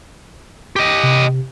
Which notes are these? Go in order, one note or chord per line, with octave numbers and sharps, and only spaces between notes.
G4 D#5
C3